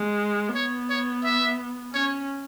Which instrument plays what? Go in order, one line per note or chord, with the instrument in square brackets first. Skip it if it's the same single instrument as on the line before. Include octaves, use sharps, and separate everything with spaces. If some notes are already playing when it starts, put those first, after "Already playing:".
Already playing: [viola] G#3
[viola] B3 [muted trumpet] C#5
[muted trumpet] C#5
E5
[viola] C#4 [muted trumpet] C#5